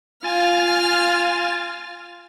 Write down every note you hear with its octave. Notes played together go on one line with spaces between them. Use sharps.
F4 F5 G#5 F6 A6